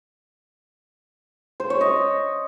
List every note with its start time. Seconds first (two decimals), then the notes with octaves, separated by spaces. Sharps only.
1.60 C5
1.70 C#5
1.81 D#5